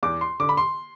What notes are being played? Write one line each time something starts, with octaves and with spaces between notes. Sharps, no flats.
E2 D6
C6
D3 D6
B5
C6